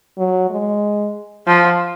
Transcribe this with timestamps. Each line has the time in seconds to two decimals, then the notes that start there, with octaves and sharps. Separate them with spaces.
0.18 F#3
0.50 G#3
1.47 F3